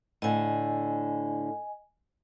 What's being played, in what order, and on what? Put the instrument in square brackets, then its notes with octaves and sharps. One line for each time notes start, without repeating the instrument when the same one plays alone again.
[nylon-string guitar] A2 D3 [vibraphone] D#5 G#5